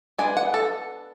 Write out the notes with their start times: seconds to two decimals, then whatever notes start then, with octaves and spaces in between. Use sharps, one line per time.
0.18 G#3 B3 D4 G#5
0.37 F#5
0.54 A4